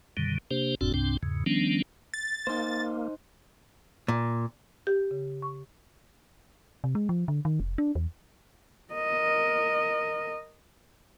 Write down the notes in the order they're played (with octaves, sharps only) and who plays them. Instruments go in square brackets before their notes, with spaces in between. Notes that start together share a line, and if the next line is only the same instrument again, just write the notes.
[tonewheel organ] F#2 B2 D3 D#3 G3
C3 A#3 D4 G4 C5
G1 F2 A2 C4 D4 F#4
C2 G2 C3 C4 D4
E2 G#2 C#3
D#3 F3 G3 B3 C#4 D4
[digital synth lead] A6
[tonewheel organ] A#3 [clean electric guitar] D#4 C5
[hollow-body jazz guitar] A#2
[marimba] G4
C#3
C#6
[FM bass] C3
G#3
F3
D3
D#3
F1
D4
E2
[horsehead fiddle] A#4 D#5